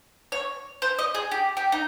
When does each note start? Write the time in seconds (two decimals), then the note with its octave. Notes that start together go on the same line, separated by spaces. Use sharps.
0.32 C#5
0.82 C5
0.99 D#5
1.15 G#4
1.31 G4
1.57 G4
1.72 D#4